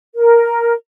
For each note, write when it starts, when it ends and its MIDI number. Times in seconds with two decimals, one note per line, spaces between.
0.15 0.72 70